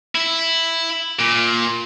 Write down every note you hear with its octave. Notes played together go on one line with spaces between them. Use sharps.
E4
A#2